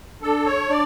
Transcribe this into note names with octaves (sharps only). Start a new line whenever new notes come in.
D4 A4
C#5
D4 D5